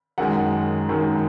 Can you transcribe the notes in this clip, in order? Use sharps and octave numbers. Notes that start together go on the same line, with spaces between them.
F#2 D#3 G#3 F#5
F#2 D#3 G#3